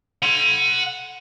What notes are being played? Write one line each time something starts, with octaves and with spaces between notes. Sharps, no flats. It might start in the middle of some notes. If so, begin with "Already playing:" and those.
F#5 C6